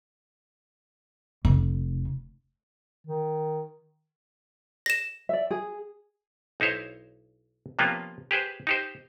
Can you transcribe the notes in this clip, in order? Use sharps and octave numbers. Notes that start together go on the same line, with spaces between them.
F1
D#3
A#6 E7
D5 E5
G#4
B1 D#4 E4 C5 C#5
C3 F3 A#3 B3 C#4 F4
G4 G#4 B4 C5
D#4 G4 C5